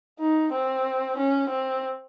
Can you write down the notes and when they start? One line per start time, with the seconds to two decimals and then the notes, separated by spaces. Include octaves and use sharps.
0.20 D#4
0.53 C4
1.18 C#4
1.50 C4